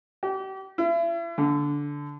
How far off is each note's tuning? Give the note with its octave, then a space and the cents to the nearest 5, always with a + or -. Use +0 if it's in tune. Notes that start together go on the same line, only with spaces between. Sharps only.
G4 -35
E4 +40
D3 -15